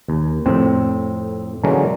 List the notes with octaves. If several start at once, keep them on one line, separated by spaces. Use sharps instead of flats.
D#2
F2 A2 C4
D3 E3 F#3 G#3 A#3 C#4